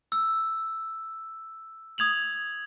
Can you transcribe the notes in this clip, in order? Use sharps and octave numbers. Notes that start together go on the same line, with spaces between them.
E6
D#6 G#6 F7 F#7